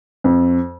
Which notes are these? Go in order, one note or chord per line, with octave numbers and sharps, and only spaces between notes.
F2